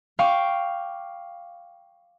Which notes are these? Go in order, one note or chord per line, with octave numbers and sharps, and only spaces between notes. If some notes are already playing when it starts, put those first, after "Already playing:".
F5 G5 C#6 D6